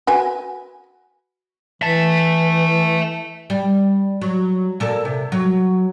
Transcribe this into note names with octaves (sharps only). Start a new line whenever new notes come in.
F#4 B4 G#5
E3 E5 A5
G3
F#3
A#2 A4 A#4
C3
F#3